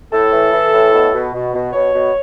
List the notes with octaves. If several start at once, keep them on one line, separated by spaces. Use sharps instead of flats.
A2 A4
E3
E3
A2
B2
B2
B2
B2
B2 C#5
B2